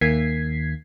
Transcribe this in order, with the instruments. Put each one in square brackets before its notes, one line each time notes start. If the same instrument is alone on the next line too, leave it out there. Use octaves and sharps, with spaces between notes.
[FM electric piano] D#2 D#3 A#3 G#6 B6 C7